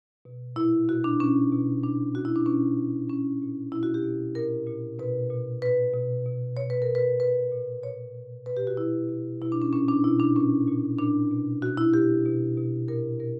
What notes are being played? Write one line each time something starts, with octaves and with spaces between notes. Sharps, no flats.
B2
A#2 E4
B2 F#4
D4
B2 C#4
B2
A#2 D4
A#2 F#4
E4
D4
B2 C#4
A#2
B2 C#4
A#2
B2 E4
F#4
G4
B2
A#2 A#4
A#2
B2 B4
A#2
A#2 B4
B2
B2
B2 C#5
B4
A#4
B2
B4
B2 B4
A#2
A#2 C#5
B2
B2 B4
G4
F#4
B2 E4
B2
B2 E4
D4
C#4
A#2 C#4
D4
B2 E4
D4
A#2 C#4
A#2
A#2 D4
B2
B2 F#4
E4
B2 G4
B2
B2
A#2 A#4
B2 A#4